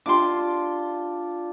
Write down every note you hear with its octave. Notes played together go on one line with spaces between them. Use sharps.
D4 F4 G4 C6 D6